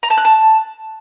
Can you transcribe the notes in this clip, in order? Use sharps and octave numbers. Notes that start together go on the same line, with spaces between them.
A#5
A5
F#6
A5